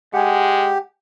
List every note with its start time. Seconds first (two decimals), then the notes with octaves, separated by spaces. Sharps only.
0.14 G#3 G4 F#5 G#5